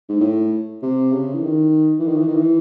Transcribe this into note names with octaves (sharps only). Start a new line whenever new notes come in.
G#2
A2
C3
C#3
E3
D#3
E3
D#3
E3
D#3
E3